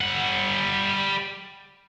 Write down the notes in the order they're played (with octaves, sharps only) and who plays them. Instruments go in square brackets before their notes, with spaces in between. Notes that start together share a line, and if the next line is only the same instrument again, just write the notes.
[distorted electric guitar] G3 F#5